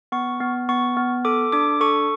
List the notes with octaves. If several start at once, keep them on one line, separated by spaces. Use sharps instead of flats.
B3 C#6
B3
B3 C#6
B3
A4 D6
D4 D6
A4 C#6